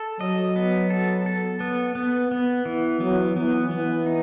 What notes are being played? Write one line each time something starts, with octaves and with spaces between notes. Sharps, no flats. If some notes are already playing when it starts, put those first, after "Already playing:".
Already playing: A4
F#3 D#5
B3
A4
A4
B3
B3
B3
E3
F#3 B3
E3 B3
E3 B3
D#4